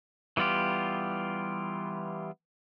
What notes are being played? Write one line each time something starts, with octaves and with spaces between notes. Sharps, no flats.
E3 G3 B3 F4 G4